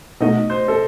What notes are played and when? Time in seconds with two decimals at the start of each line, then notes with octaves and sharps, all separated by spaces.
0.21 B2 A3 D#4 F#4 D#5
0.50 C5
0.68 A4